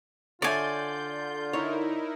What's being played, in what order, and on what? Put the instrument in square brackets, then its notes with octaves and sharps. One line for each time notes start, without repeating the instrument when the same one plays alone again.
[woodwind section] D3 F4 [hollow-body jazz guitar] C#5 E5 [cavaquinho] D5 G#5 [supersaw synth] G6
[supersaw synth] D#4 E4 A#4 [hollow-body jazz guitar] C#5